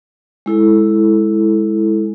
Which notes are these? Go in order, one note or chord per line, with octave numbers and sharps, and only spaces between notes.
G#3 E4 A4